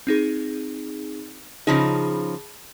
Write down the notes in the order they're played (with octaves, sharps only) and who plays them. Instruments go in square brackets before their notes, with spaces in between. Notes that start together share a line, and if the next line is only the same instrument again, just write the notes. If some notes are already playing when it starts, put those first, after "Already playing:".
[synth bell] C4 D#4 G#4
[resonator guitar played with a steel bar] C#3 F3 D#4 [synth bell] G#4 A5 B5